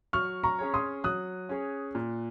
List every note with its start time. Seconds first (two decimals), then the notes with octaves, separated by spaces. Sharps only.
0.13 F#3 C#6 F6
0.44 A#5 C#6
0.59 C#4 G#4 C#5
0.74 C6 D#6
1.04 F#3 D#6 F#6
1.49 C#4 G#4 C#5
1.95 A#2